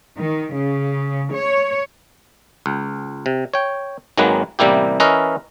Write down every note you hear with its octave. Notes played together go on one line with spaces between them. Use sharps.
D#3
C#3
C#5
C#2
C3
C#5 G5
G#1 D#3 F#3 G#3 A#3 B4
A1 C3 G3 A#3 E4 G4
E3 C#4 A#4 B4 D#5 E5